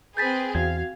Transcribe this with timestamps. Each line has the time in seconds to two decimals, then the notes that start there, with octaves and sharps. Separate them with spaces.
0.17 C4 G#4 B4 G6 A6 B6
0.55 E2 F#4 F5 G#6